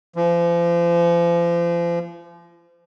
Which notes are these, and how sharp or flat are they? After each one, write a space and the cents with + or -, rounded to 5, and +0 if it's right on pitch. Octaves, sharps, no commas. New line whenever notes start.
F3 -35